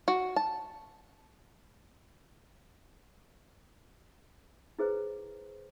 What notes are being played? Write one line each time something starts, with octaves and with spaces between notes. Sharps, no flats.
F#4
A5
E4 G#4 B4 C5